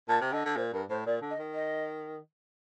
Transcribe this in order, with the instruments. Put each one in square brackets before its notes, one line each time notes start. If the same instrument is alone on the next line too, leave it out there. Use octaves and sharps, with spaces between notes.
[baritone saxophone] A#2 [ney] A5
[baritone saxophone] C3
[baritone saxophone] D3 [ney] D#5
[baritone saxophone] D3
[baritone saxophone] A#2 [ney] C5
[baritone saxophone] G2 [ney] A#4
[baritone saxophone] A2 [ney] C5
[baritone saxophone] A#2 [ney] D5
[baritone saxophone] D3
[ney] D#5
[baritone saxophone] D#3
[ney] D#5